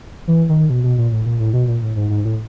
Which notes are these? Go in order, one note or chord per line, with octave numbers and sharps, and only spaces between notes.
E3
D#3
B2
B2
A#2
A2
A#2
A2
B2
A#2
A2
G#2
G#2
A2